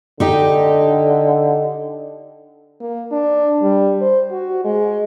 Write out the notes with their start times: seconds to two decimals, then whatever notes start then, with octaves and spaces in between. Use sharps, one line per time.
0.20 D3 D#4 G4 D#5
2.81 A#3
3.12 D4
3.62 G3
4.01 C5
4.31 F#4
4.65 G#3